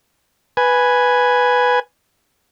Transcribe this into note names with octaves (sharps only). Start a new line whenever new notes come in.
B4 G#5